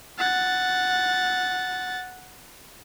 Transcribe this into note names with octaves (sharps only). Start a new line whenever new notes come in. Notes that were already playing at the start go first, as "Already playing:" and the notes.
F#5 A6